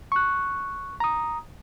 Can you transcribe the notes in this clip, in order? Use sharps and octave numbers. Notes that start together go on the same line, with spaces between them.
C#6 F#6
A#5 D#6